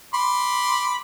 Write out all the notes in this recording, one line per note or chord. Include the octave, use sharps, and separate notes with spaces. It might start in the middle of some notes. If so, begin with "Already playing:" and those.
B5 C6 D6